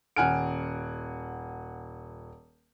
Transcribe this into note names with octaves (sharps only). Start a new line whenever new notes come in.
D#1 F#5 G#5 F6 D7